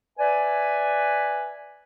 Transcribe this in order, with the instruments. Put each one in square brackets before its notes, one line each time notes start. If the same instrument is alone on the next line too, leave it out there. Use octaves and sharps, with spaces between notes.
[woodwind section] B4 D5 E5 G#5